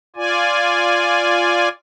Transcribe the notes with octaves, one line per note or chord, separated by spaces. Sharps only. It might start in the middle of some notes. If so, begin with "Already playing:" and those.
F4 D5 G#5